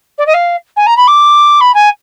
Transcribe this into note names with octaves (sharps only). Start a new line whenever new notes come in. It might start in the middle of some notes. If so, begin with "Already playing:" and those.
D5
D#5
F5
G#5
A#5
B5
D6
B5
G#5